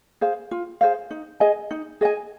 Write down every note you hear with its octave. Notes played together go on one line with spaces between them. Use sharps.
G#4 C5 F5
F4
G#4 C5 F5
D#4
G#4 D#5 G#5
D#4
G#4 D#5 G#5